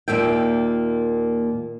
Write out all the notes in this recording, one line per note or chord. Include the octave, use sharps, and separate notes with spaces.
D#2 A#2 A#3 E5 G5